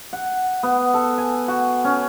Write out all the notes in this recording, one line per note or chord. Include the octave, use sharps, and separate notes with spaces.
F#5
B3
A4
G#5
F#4
C#4